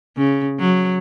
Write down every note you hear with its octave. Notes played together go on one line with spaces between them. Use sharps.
C#3
F#3